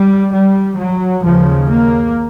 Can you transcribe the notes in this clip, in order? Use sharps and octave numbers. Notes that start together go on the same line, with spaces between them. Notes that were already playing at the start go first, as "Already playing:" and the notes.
Already playing: G3
G3
F#3
D#2 C#3 F3
A#3